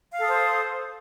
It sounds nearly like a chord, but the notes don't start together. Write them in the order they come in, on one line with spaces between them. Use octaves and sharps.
F5 A4 D#6 C5